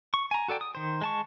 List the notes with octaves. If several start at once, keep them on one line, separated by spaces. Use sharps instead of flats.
C#6
G#5 A#5
F#4 A4 D5 G5
D#6
D#3 C5
G#3 A5 C#6